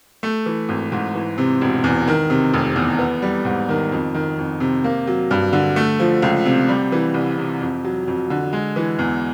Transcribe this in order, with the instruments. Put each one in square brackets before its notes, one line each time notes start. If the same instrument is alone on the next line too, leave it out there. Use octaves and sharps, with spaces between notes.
[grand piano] A3
E3
G#1
G#2
E3
C3
E1
E2
D#3
C3
F1
E2
B3
G3
G#2
D#3
F2
D#3
F2
C3
A#3
F#3
G2
D3
A3
F3
C#2
C3
G3
E3
C2
C3
F2
F#3
F2
D3
G#3
E3
E2